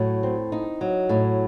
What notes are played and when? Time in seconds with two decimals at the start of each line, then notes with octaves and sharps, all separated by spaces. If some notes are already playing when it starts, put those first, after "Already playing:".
Already playing: A2 F#3
0.23 C4
0.52 D#4
0.81 F#3
1.09 A2